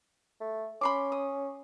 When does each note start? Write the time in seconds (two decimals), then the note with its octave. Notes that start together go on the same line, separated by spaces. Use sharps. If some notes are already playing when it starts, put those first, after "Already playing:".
0.40 A3
0.81 C#4 B5 C6 D6
1.12 D#6